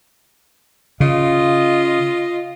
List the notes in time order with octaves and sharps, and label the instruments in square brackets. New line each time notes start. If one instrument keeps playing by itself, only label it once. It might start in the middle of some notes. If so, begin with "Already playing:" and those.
[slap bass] C#3 [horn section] F4 D#5